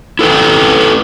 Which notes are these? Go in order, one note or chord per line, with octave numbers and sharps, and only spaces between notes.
E4 A4 B4 G5